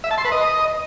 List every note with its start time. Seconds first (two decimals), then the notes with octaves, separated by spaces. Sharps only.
0.04 E5
0.11 A5
0.18 C6
0.25 B4
0.32 D#5